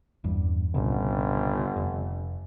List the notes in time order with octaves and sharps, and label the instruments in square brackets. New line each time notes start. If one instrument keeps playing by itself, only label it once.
[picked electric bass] G1 E2 G2
[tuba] G1 [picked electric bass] C2 A#2 C#3
[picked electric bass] F1